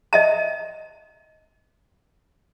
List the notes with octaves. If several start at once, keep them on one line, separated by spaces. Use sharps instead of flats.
D#5 E5 A5